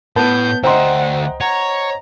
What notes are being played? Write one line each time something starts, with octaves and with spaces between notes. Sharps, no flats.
A2 B3 A5 G6
D2 C5 D#5 E5 F#5 G5 A#5 C6
C#5 F#5 A#5